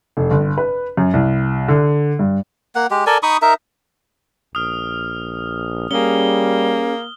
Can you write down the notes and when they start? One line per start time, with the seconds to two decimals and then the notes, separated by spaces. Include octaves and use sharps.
0.17 F1
0.31 G1
0.58 B4
0.97 F#2
1.13 C2
1.68 D3
2.19 G2
2.75 A#3 F#5
2.91 G#3 G4
3.07 A4 A#4 D5 G#5
3.23 D#4 B5 C#6 D#6
3.42 D#4 A#4 E5
4.55 A#1 D#6 F6
5.91 G3 A#3 C#4 G#4 G7